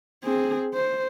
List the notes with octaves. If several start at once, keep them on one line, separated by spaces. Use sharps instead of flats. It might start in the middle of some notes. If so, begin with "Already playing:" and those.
C4 G#4
C5